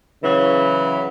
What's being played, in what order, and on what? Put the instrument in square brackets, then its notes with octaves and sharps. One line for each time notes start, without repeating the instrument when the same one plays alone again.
[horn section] C#3 E3 F#3